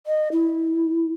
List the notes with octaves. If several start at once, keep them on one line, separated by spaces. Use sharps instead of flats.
D#5
E4